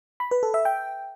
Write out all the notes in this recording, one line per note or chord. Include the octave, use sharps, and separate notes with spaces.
B5
B4
A4
E5
G5